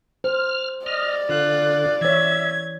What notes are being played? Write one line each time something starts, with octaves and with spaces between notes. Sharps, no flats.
C5 F6
D5 D#5 F6
D3 F4 F#6
E3 C#5 E5 G#6